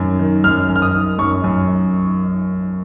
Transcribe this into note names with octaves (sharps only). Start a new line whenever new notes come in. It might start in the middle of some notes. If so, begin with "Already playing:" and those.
Already playing: F#2 D#3
D#3
F#2 F6
F#2
F6
D#6
D#3
F#2 C#6
F#2